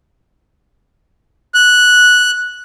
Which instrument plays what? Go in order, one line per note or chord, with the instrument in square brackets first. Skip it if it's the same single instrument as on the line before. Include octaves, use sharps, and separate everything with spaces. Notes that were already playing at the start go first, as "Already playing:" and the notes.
[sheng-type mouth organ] F#6